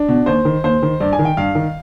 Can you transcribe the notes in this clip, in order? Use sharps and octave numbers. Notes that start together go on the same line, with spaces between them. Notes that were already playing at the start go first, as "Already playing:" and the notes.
Already playing: D4
B2
D#2 C5
D#3
D#2 C5
D#3
G2 D5
G#5
D#3
G5
G2 F5
D#3